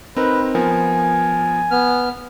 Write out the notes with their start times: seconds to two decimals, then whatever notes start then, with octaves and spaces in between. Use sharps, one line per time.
0.16 C4 D#4 A#4 B4
0.55 F3 B3 A#4 G#5
1.71 B3 F6